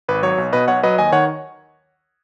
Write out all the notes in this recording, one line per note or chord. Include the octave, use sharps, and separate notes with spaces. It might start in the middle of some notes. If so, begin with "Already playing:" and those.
G#1 B4
F#3 C#5
B1
B2 B4 D#5
B1 C#5 F#5
F#3 B4 D#5
D#2 D#5 G#5
D#3 C#5 F#5